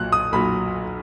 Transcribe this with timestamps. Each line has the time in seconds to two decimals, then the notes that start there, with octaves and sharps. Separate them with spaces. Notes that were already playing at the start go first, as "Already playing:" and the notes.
Already playing: B1 A#2 F#3 F#6
0.12 D#6
0.32 B1 A#2 F#3 B5